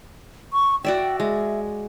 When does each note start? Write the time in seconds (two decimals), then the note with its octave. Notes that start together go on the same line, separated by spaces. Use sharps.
0.53 C#6
0.85 F#4 D5 E5 G5
1.20 G#3 E5